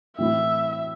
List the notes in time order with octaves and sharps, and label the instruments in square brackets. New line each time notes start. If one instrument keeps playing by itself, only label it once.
[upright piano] A2 E3 C4 E4 [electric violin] E5